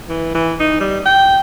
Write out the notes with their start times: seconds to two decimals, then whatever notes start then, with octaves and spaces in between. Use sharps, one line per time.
0.09 E3
0.34 E3
0.60 D#4
0.80 G3
1.05 G5